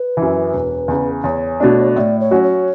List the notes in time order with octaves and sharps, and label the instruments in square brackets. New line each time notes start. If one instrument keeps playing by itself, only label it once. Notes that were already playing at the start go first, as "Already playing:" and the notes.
Already playing: [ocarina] B4
[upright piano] E3
F#2
E1
E2 C#3
[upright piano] E2 [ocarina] C#5
[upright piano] B2 A3 D4
[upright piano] A2 [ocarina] D5 E5
[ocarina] C#5
[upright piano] F#3 C#4 F#4
[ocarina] C#5